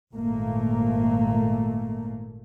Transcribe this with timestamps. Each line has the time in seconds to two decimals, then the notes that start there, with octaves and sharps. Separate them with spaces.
0.15 G#1 A#2 A3 A#3